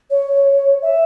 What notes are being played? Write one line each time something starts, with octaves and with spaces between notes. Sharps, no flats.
C#5
E5